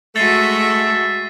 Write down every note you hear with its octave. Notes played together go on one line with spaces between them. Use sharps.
G#3 A3 F#4 E5 A6 C7 D#7